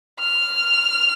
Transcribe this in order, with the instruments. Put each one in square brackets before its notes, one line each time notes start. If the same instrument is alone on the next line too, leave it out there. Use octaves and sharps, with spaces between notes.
[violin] F6